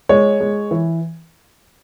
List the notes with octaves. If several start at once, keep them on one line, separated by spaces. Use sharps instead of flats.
G#3 C#5
G#3
E3